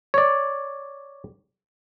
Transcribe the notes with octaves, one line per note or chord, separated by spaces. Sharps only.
C#5 D5